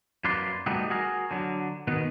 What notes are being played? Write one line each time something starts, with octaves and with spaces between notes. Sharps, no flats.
F#2 A#3 B4 D5 C6
G3 A3 B3 D#4 F#4 G4
F#4 G#4 A#4
D3 F#3
B2 D#3 B3